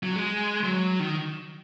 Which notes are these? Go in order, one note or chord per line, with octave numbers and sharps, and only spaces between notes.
F#3
G#3
F#3
D#3